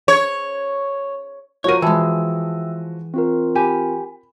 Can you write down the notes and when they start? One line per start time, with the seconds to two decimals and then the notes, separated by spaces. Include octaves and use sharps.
0.08 C#5
1.64 F3 F#4 A#4 C#5 D#7
1.82 E3 G#3 E5 G5 A5 E6
3.14 C4 F4 A#4
3.55 G4 G#5 B5